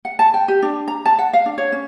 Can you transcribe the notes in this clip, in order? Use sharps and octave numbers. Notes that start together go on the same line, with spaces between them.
F#5
A5
G5
G4
D4
A#5
A5
F#5
F5
D4
C#5
C#4